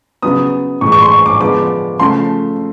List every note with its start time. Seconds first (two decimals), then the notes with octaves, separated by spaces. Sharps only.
0.22 C#3 F#3 B3 D#6
0.81 A2 E3 G#3 C#6
0.92 C#6
1.02 C6
1.11 C#6
1.26 D6
1.41 D3 F3 G#3 B3 D6
2.00 C#3 F3 A3 C6